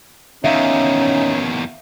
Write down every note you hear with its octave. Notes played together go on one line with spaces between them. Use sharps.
E2 D#3 C#4 D#4 E5 F5